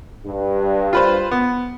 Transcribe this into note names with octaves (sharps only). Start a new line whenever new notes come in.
G2
F4 B4 C5
B3